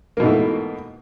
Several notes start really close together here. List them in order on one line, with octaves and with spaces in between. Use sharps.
A#3 B2 G#2 A3 E3